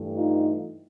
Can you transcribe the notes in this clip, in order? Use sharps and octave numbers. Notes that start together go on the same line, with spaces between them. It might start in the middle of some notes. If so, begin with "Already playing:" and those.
Already playing: G2 E3 A3
D#4 F4